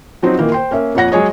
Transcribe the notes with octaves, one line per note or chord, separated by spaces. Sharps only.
F3 F#3 C4 D#4
A#2 D#3 E3 A#3
C5 G5 C6
A#3 C#4 E5
F2 A#2 C#5 F#5 A#6
F#3 G#3 G#4 C#5 D#5